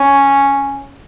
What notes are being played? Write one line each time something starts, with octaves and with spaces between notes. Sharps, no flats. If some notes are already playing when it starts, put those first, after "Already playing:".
Already playing: C#4